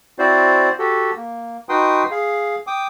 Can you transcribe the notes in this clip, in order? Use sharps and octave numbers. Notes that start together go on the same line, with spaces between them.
C4 E4 F#4 C5 D5
F#4 G4 A4
A#3
D#4 F#4 B4 G5 C6 D#6
G#4 F5
G5 D6 D#6